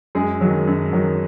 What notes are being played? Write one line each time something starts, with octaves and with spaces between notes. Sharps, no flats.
F#2 G#3 G#4
D#3 F#3
F#2
D#3 F#3